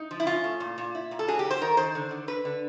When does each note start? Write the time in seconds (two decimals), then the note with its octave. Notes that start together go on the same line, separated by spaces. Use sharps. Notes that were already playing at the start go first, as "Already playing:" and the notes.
Already playing: D#4
0.11 F3
0.20 E4
0.27 C#4 F4
0.44 A2
0.60 A#2
0.78 A#2
0.95 E4
1.11 A#2
1.19 A4
1.28 F#3 G#4
1.39 G4
1.45 F#3
1.50 C5
1.61 D#3 A#4
1.77 D#3 C5
1.95 D3
2.11 D3
2.28 D3 B4
2.45 D3